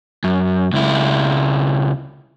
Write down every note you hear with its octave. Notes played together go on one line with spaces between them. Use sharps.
F#2
C#2 E4